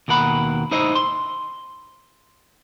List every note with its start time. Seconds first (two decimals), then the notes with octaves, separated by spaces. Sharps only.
0.08 D#2 B2 A#4 F#5 B5
0.71 D#4 E4 C5 D#5
0.95 C6